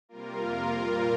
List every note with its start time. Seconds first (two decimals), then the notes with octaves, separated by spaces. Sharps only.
0.09 C3 G3 A#3 F4 A#4
0.39 F2 C3 A#3
0.69 A#2 G3 A#3